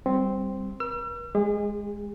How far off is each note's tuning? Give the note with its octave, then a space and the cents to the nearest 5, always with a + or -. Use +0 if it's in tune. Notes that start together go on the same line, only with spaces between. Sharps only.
G3 +0 C4 +0
B4 -45 E6 +45
G#3 -5 G#4 -35